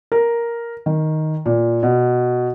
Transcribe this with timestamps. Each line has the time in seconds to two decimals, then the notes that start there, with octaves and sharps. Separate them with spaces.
0.12 A#4
0.86 D#3
1.46 A#2
1.83 B2